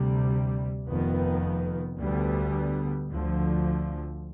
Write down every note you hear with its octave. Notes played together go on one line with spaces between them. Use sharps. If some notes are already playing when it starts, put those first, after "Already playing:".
Already playing: D2 C3 G3
F1 F2 D#3 B3
D2 D3 G3 B3
D2 D3 F3